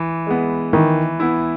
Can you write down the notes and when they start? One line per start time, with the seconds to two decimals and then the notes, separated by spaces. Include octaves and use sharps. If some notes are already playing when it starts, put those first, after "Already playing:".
Already playing: E3
0.27 G#3 B3
0.73 D#3 E3
1.20 B3 E4